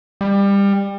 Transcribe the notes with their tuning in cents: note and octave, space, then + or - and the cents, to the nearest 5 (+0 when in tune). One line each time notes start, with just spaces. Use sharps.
G3 +25